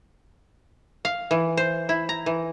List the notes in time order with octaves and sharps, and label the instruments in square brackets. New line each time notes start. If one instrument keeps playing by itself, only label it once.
[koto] F5
E3
C5
E4
A#5
E3